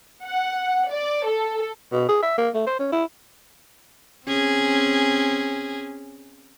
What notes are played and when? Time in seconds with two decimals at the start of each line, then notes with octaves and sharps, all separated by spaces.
0.24 F#5
0.90 D5
1.26 A4
1.92 B2
2.09 G#4
2.22 E5
2.38 A#3
2.54 A3
2.67 C5
2.79 C#4
2.92 E4
4.27 C4 C#4 G#4